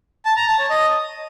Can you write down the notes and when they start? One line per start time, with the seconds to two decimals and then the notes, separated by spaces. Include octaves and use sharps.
0.26 A5
0.37 A#5
0.48 A5
0.59 C#5
0.70 D#5